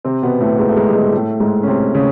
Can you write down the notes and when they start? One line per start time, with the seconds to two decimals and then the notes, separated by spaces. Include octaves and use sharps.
0.05 C3 C4
0.23 B2 B3
0.40 A2 A3
0.59 G#2 G#3
0.69 A3
0.77 G#2 G#3
0.87 G3
0.95 G#2 G#3
1.13 A2 A3
1.40 G#2 G#3
1.63 C#4
1.67 C3 C4
1.94 C#3 C#4